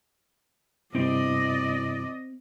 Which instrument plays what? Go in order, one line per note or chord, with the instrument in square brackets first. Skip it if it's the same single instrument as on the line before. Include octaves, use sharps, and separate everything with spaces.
[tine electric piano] G2 C3 E4 [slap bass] C4 [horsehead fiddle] D5 D#5